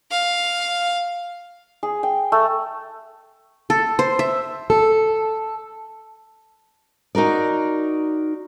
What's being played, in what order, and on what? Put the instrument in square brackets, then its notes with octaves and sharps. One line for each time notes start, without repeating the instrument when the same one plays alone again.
[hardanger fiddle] F5
[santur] G#4
G5
A3
[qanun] A4
C5
E5
[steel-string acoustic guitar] A4
D#4 F#4 A#4 D5